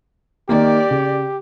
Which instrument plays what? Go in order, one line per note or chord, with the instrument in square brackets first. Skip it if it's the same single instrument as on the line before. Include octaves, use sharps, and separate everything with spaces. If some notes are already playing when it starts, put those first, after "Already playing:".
[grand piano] D#3 A#3 [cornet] G4 [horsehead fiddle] D5
[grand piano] C#3